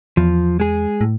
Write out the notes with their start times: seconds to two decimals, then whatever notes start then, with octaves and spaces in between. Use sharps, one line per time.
0.17 E2 F3
0.60 G#3 G#4
1.01 A2